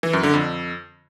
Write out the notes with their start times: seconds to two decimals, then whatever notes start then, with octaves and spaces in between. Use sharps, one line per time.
0.03 E3
0.13 F#2
0.23 D3
0.33 F2